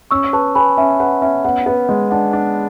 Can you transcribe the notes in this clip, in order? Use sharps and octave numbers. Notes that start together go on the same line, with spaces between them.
C#4 C#6 E6
B4 A5 C#6
B4 G#5 B5
C#4 E5 G#5
B4 F#5
C#4 E5
B3 F#5
B3
G#3
D4 F#5
D4